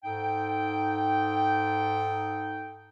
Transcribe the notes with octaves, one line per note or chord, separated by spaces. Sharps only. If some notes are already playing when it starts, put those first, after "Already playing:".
G#2 D#4 A4 G5